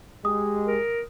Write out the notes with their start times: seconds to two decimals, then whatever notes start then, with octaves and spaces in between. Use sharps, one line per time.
0.25 G#3 G4 D#6
0.66 A#4